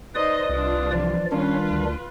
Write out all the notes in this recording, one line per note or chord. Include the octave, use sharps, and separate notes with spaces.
D#4 B4 C5 D5 D#5 D#6
C2 D4 F4
E3 F3 D5
D#3 G3 C#4 D4 F4 B4
D2